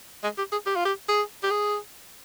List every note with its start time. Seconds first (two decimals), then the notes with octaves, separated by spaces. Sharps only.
0.24 G#3
0.38 G4
0.52 G#4
0.66 G4
0.76 F4
0.85 G4
1.09 G#4
1.43 G4
1.51 G#4